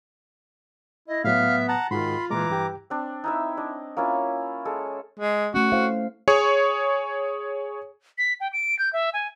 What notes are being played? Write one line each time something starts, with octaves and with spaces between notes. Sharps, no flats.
E4 D#5
A2 F#3 B3 E5 F5
F#5 A5 A#5
G#2 D#3 F4 F#4 G#4 B5 C6
A#2 E3 G#3 A#5 D6
G2 G4 G5
C4 D4
D#4 E4 E5
D4 D#5
A#3 C#4 E4 F4
G#3 A4
G#3
A3 C#4 F#4
E4 C5 F5
G#4 C#5 C#6
B6
G5
D7
G6
E5
G#5